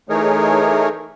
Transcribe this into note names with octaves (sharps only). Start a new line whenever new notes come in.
E3 A3 D#4 G#4 A#4 C#5